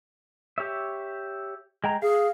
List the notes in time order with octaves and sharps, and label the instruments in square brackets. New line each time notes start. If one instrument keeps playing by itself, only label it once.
[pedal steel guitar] G4 C#5 E5
G#3 G5 A#5
[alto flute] G#4 [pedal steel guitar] F5